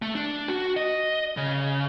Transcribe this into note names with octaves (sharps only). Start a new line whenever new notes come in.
A3
D4
F#4
D#5
C#3